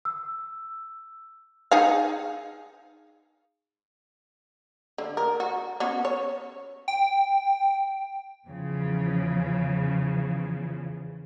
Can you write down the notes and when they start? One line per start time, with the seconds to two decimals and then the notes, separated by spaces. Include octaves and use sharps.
0.05 E6
1.71 D#4 G#4 F5
4.98 D3
5.17 A#4
5.40 F#4
5.80 B3 C#4 F#4
6.05 C#5
6.88 G5
8.46 E2 C#3 F3